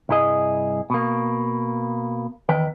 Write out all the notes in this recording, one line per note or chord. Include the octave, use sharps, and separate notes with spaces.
C2 G2 E4 G#4 D#5
B2 A#3
E2 D#3 B4 G5